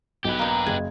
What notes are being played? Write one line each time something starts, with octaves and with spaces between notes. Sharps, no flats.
B1 G4 B4
A#3 D#4
F#1 G#5